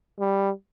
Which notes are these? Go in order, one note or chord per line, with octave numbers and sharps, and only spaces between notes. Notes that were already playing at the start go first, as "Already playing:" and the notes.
G3